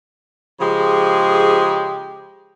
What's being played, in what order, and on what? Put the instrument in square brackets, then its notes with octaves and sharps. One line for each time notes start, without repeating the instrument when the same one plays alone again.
[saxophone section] C#3 F3 G#3 G4 G#4